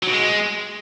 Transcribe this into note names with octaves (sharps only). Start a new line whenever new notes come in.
F#3
B2
G#3